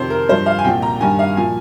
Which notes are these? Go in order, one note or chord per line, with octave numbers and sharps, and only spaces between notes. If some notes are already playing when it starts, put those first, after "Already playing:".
Already playing: F2 C3 D#3 C5
A#4
G2 F3 C5
F5
G#5
C2 A#2 F3 G5
A#5
G2 D#3 G#5
F5
A#2 F3 G#5